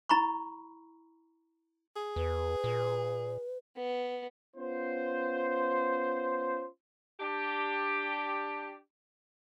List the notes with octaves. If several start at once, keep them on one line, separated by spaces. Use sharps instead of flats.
E4 A#5 B5 C#6
G#4
E2 B4
A#2
B3
B3 C#4 F4 C5
D4 G4